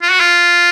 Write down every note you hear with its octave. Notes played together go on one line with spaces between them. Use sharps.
F4
F#4
F4